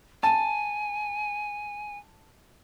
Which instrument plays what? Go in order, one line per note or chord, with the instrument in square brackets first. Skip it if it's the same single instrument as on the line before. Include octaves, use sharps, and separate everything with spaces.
[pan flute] G#5 [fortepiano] A5